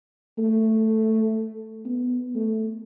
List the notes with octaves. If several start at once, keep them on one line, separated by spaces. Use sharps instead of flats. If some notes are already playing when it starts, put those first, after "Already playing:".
A3
B3
A3